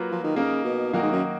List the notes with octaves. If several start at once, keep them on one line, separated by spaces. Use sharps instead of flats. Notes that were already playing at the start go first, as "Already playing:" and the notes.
Already playing: F#3 A#3 F4 B4
F3
D#3
C#3 A#3 D#4 A#4
B2
A#2 D#3 F#3 A#3 D#4 F#4
G#2
F#2